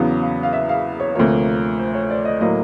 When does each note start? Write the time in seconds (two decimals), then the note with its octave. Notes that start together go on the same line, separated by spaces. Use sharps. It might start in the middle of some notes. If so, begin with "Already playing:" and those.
Already playing: E2 C#3 F#3 B3 F5
0.22 F5
0.43 F5
0.53 E5
0.69 F5
1.00 C#5
1.15 D2 C3 F3 A#3 C#5
1.78 C5
1.94 C#5
2.10 D5
2.25 D#5
2.41 A2 F#3 A#3 D#5